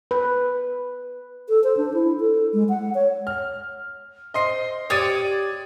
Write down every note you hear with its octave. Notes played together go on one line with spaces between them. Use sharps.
B4
A4
C5
D4
E4
A4
G#3
F#5
C#5
F6
C5 D#5 C6 C7
G4 C#5 D5 D#6 A6 D#7